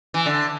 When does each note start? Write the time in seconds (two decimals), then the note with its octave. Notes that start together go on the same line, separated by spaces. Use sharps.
0.14 E3
0.26 D3